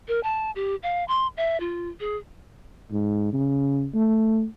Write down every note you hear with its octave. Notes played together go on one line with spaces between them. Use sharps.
A#4
A5
G4
F5
C6
E5
F4
G#4
G#2
C#3
A3